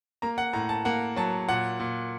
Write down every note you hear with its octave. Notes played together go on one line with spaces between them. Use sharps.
A#3 A#5
F#5
A2 A#5
A5
A#3 F#5
F#3 A5
A#2 F#5
A#2